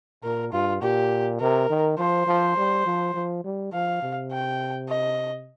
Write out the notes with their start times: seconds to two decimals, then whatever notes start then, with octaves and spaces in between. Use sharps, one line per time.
0.24 A#2 A#4
0.52 G2 F4
0.81 A#2 G4
1.40 C3 A#4
1.70 D#3
1.98 F3 C5
2.27 F3
2.57 G3
2.86 F3
3.14 F3
3.44 G3
3.73 F3 F5
4.02 C3
4.32 G5
4.89 D#5